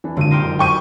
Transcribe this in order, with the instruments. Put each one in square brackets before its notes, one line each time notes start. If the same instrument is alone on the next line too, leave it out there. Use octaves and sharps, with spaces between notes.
[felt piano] E3 D4
[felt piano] G#1 A#2 [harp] D3 D#7
[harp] D#4 F4 G4
[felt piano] F#1
[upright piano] G5 C#6 D#7